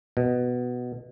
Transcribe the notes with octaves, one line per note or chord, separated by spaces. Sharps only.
B2